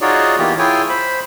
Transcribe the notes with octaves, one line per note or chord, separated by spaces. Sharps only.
D#4 F4 F#4 G#4 C#5 D5
E3 A#3 B3 F4 G4
E4 F4 G#4 C#5 G5 G#5
C5 B5